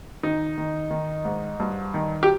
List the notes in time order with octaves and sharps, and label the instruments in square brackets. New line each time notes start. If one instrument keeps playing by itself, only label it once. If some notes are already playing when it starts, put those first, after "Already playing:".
[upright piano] D#3 D#4
D#3
D#3
G#2
G2
D#3
G4